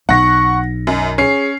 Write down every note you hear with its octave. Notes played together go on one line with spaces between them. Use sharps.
B1 F#5 C#6 A#6
F#2 D#5
C#4 G#4 C7